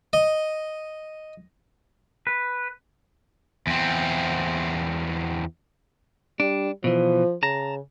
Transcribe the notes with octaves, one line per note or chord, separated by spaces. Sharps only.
D#5
B4
E2 C4
G3 D4
B2 E3 F3
C#3 A5 A#5